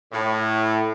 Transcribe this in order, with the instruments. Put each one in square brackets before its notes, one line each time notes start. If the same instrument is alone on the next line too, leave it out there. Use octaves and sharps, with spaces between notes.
[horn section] A2